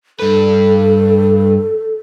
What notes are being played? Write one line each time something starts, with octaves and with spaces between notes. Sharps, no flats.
G2 A4 B4